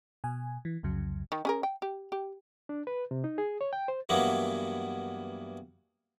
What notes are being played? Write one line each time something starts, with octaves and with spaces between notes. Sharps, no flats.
B2 G#5
E3
C2 F2 C#3 F#3
D#3
C#4 G#4 A#4
G5
G4
G4
D4
B4
C3
D#4
G#4
C#5
G5
C5
G2 E3 F#3 A#3 B3